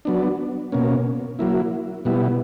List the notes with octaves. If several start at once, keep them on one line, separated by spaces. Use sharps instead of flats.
F#3 B3 D4
B2 A#3 C#4
F#3 A#3 E4
B2 G3 B3 E4